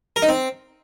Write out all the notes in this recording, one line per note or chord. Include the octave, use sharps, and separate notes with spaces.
A#4
D#4
C4